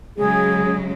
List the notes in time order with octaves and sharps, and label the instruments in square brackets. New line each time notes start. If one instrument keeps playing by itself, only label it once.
[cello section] C#3 F#3 G#3 [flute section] G#4